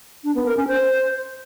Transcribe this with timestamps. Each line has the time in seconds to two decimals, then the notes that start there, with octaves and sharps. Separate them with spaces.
0.24 D4
0.35 B3
0.46 A#4
0.57 C#4
0.68 C5